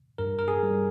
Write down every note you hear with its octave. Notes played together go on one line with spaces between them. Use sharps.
G2 A#4
A#4
G#4
G3